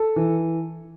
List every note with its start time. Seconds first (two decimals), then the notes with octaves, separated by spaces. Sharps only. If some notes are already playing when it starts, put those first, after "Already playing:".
Already playing: A4
0.16 E3